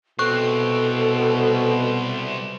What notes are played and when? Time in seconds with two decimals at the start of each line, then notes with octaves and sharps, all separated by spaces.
0.19 C2 B2 C4 A4 C#6 F#6